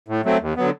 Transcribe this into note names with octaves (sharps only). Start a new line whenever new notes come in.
A2
F#3 A3 C4
D#2
D3 F#3 B3